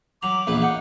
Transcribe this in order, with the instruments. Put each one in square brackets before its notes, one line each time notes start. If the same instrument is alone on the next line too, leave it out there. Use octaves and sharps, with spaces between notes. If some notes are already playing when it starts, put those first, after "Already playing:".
[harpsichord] F#3 A#5 [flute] D6
[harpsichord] A#1 E2 B4
[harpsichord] D#4 [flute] F#5